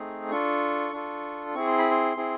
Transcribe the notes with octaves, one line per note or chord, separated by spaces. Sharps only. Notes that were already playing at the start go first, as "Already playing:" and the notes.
Already playing: A3 C4 D#4 G#4
D4 F4 A4 C#6
D4 F4 A4
C4 E4 G#4 C#6
C6
B5
C6
C4 E4 G#4